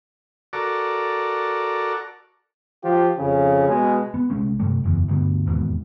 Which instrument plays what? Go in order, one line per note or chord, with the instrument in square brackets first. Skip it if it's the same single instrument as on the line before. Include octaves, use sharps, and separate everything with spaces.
[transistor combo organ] F#4 A4 A#4 D5
[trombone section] F3 F4 G4
F2 C#3
B2 G#3
[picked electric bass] B3
C2 G#3 C#4
G2 C3 G3 A3
F#1 E2
D2 G2 B2
E1 D#2 G#2 B2